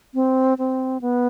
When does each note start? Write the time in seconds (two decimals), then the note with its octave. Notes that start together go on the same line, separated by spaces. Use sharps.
0.14 C4
0.58 C4
1.01 B3